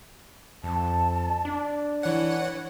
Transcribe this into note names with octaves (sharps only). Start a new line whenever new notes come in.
F2 A5
D4
E3 C#5 F#5